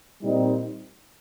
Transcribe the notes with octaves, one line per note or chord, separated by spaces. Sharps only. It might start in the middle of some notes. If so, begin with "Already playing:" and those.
A#2 G3 C4 D#4